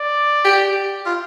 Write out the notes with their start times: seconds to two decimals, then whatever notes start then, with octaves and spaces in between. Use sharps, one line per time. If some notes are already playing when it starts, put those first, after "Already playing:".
Already playing: D5
0.44 G4
1.06 F4